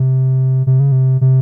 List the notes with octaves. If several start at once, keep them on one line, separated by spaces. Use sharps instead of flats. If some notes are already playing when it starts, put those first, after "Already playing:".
Already playing: C3
C3
C#3
C3
C3